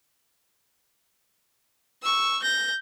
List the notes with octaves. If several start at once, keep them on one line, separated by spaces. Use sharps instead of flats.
C#6 E6
G6 A#6